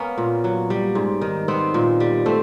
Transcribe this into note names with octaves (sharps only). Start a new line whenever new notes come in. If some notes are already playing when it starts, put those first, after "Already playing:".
Already playing: A#3 B3 C#4
A#2
F#3
G3
G#2
D#3
B3 C4
A#2
G3
A3 C4